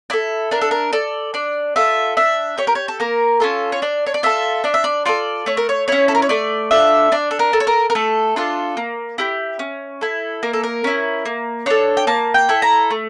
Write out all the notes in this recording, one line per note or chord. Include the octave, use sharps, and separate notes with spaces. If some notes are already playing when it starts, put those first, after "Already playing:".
E4 A4 D5
D4 A#4
A4
A#4
A4 D5
D4 D5
F4 A4 E5
D4 E5
G4 C#5
A#4
C#5
A4
A#3 A#4
C#4 F4 A4
C#5
D4 D5
C#5
D5
F4 A4 E5
D4 D5
E5
D5
F4 A4 D5
A3 C#5
A#4
C#5
C#4 E4 C#5
A4
A#4
C#5
A3 D5
D4 F4 A4 E5
D4 D5
A4
A#4
A4
C#5
A#4
A#4
A3 A4
D4 F4 A4
A#3
E4 G4
C#4
E4 A4
A#3 A#4
A4
A#4
C#4 E4
A#3
D4 A4 C#5
G5
A#3 A5
G5
E4 A4
A#5
A3